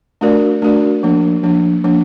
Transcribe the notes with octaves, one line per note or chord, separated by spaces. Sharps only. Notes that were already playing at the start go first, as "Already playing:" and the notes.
A3 D4 F#4 A#4 D5
A3 D4 F#4 A#4 D5
F3 A#3 D4
F3 A#3 D4
F3 A#3 D4